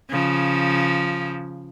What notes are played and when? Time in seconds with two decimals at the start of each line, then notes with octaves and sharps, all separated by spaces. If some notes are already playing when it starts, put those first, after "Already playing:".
0.10 C#3 F3